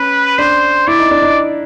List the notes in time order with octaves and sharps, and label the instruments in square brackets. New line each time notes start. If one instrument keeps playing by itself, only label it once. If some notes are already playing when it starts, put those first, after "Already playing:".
Already playing: [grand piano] C#4 [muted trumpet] B4
[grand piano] D4 [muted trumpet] C5
[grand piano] E4 [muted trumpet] D5
[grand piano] D#4
D4
D#4